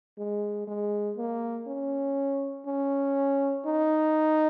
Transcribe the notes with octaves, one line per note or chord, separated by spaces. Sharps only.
G#3
G#3
A#3
C#4
C#4
D#4